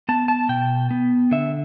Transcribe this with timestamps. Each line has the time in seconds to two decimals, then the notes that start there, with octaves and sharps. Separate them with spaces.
0.09 B3 A5
0.28 A5
0.49 B2 G5
0.91 B3
1.31 D3 E5